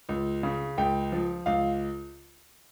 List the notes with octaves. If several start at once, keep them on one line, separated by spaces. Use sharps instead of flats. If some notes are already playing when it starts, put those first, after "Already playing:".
C#2
C#3
C#2 G5
F3
C#2 F5